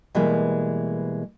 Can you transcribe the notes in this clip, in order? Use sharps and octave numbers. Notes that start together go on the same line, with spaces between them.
B2 E3 G3 G#3 A#3